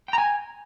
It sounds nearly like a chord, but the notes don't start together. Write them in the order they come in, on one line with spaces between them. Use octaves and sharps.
G5 A#5 G#5